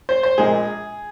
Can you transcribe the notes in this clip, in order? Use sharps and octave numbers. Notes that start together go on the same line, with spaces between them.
C5
C5
A#1 A#2 G#3 G#4